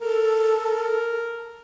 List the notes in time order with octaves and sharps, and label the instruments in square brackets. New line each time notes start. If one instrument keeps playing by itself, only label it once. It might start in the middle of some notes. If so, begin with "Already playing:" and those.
[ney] A4 [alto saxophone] A#4